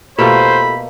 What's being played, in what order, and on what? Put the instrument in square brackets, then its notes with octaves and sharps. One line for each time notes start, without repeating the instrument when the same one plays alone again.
[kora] B2 A3 A#3 [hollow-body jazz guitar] F4 G4 A4 [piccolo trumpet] C5 [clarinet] B5